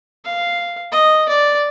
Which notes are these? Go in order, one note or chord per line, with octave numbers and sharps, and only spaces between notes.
F5
D#5
D5